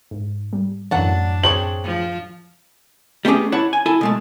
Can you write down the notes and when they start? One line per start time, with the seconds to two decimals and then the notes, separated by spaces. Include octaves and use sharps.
0.11 G#2
0.53 G3
0.91 F#2 A2 E3 F#3 D4 F#5 A5
1.44 C4 G#4 C#5 F#7
1.83 F3
3.25 G3 A3 B3 C#4 G4 G#4
3.52 E4 C#5 F#5 A5
3.73 G#5
3.86 E4 A4 G#5
4.01 B2 G#3 A3